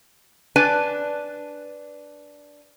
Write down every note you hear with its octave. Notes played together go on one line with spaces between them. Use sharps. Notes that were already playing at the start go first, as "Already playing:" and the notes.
D4 B4 D5 G#5